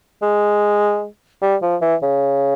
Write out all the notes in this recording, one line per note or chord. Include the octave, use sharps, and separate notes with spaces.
G#3
G3
F3
E3
C#3